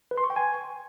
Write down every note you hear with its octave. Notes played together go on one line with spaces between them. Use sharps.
B4
C6
C#6
G5
G#5